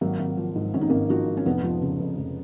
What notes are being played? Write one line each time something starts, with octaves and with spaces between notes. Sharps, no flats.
G#1 F#3 A#3
G#1
F3
G#2
G#1 C#4
D#4
G#1 A#3 C#4
F3 D#4 F#4
G#2
C#4
F1 B3 D#4
F3
C#3
F2
F1